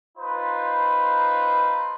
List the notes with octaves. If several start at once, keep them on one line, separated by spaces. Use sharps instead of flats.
D#4 F4 B4 C5